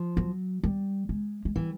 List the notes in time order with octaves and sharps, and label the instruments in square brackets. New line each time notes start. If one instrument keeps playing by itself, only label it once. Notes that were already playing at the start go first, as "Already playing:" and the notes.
Already playing: [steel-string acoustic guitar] F3
[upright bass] F#3
G3
G#3
G#3
[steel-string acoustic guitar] E3 [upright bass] G3